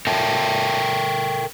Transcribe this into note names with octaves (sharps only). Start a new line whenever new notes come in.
A4 A#4 E5 G5 A5